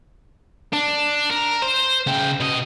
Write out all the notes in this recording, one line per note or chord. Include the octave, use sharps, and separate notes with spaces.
D4
A#4
C5
C#3 G5
B2 D#5